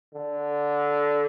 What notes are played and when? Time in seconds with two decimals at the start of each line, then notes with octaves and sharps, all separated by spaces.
0.14 D3